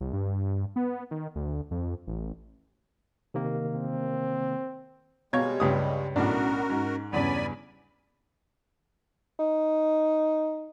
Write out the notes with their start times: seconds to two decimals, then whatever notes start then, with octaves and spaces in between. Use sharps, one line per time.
0.01 C2
0.13 G2
0.76 B3
1.11 D#3
1.35 D2
1.71 F2
2.07 A1
3.34 C3 D#3 A#3
3.75 C4
5.33 B2 G3 G#3 C#5 F5 A#5 G#6
5.48 G4
5.60 C#2 G2 D#6
6.16 B1 A2 C#4 D4 F#4 A#4
6.70 G#2
7.13 E2 G2 C#3 C#5 D5 G#5 B5
9.39 D#4